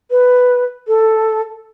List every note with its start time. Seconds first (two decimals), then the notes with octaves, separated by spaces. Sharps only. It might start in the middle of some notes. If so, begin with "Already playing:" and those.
0.11 B4
0.88 A4